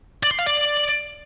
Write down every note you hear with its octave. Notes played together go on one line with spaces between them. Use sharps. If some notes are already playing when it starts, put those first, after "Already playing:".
D5
C6
F5
D5